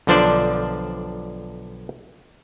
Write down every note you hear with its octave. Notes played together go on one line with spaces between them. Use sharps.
B1 D3 F3 D4 C5 D5